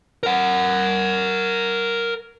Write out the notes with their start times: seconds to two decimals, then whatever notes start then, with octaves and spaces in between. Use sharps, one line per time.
0.23 A#4 F#5